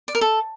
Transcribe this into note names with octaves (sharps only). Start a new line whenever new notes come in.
D5
A#4
A4